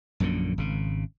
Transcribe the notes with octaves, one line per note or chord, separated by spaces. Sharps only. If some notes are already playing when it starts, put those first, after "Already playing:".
A#1 F#2 A#2 D3
G#1 C#3